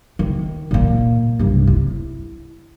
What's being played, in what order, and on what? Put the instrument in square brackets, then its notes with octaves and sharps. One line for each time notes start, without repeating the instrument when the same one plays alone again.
[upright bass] D#3
A#2 A#3
C2 G2
E4